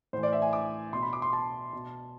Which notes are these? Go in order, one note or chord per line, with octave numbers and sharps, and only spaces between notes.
A2 E3 C5
D5
E5
G#5
D6
B2 C6
B5
D6
C6
A5
B2